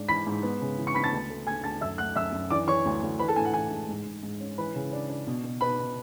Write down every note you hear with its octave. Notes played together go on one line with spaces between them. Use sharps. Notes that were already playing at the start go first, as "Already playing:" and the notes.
Already playing: G#2 D4
E3 B5 B6
G#2
B3
C#3
E3
C#6 C#7
B3 B5 B6
A5 A6
D2
A3
A3 G#5 G#6
D2 A5 A6
F#2 E5 E6
A3 F#5 F#6
F#2 E5 E6
F#2
E3 D5 D6
E3 C#5 C#6
D2
D2
E3 B4 B5
A4 A5
A2 G#5
F#5
E3 G#5
G#3
G#2
G#2
G#2
C#4
E3 B4 B5
C#3
D4
D4
B2
B2
B2 B4 B5
B2